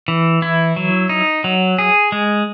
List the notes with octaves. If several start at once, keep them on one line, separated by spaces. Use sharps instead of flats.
E3
E4
F#3
D#4
F#3
G#4
G#3